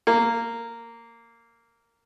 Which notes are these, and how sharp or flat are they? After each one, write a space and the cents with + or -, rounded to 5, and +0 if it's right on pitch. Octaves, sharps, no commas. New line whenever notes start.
A#3 -10